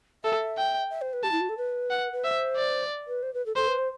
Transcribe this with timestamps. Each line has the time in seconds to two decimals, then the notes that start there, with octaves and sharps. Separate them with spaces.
0.24 A4 E5
0.57 G5
0.90 E5
1.01 C5
1.13 B4
1.24 G4 A5
1.32 E4
1.41 F#4
1.49 A4
1.57 B4
1.90 F#5
2.12 B4
2.24 C5 E5
2.57 D5
3.07 B4
3.23 C5
3.34 B4
3.46 A4
3.56 A4 C5
3.68 B4
3.78 C5